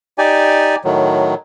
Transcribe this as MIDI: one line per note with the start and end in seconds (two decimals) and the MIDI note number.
0.18 0.76 63
0.18 0.76 67
0.18 0.76 74
0.18 0.76 80
0.85 1.35 45
0.85 1.35 51
0.85 1.35 54